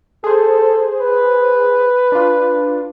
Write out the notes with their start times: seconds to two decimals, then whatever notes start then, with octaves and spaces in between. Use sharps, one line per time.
0.24 G#4 A4 C5
1.00 B4
2.12 D4 F4